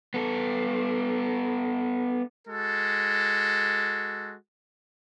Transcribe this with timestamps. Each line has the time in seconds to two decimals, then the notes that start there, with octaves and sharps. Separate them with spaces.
0.14 B3 A4
2.47 G#3 F#4 A4